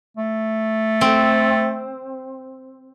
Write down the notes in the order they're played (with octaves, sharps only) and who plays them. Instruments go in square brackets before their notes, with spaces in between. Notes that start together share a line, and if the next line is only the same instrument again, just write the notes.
[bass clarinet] A3
[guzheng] C4